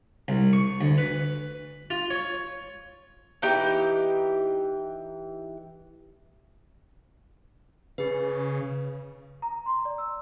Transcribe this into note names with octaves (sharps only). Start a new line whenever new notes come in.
C2
C#6
D2
B4
F4
C#5
E3 D#4 G4 G5
C#3 G#4 B4
A#5
C6
D5
E6